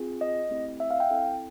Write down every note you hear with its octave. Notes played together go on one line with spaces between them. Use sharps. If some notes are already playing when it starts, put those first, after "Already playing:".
Already playing: C4 F4 G#4
D#5
A3 C4 E4 G4
E5
F5
G5
C4 E4 A4